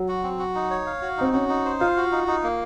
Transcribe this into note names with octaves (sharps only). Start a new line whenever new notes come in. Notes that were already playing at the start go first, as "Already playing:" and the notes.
Already playing: F#3
F#4
C4
F#4
D#4
C#5
F5
F#4
C4 D#4
C#4 F#4
D#4
C5
F4 F5
F#4
D#4
D#4
A#3